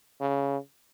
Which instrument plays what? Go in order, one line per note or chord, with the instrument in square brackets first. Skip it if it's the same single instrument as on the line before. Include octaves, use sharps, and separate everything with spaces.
[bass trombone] C#3